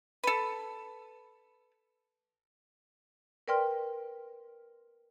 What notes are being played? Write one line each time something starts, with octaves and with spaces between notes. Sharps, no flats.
A4 B4
A#4 B4 D5 G5 C6 F6